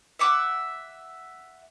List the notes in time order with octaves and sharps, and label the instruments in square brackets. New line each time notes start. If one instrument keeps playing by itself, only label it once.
[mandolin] E5 F#5 D6